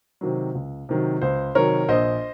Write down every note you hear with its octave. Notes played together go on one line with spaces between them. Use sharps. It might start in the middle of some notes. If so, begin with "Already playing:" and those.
C3 D#3 F#3
C#2
C3 D#3 F#3
C#2 C5
C3 D#3 F#3 A#4 C#5
A#1 C5 D#5